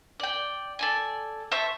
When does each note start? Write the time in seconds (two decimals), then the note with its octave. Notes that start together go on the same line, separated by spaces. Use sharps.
0.20 D5 G5
0.79 A4 D5 G#5
1.52 C5 E5 A5 C#6